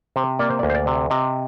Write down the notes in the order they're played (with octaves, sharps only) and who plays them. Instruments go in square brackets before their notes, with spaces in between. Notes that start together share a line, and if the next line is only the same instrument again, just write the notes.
[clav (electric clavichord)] C3 C5
A#3 D5
C5
D5
D2
C5
D5
C3
C3 D#5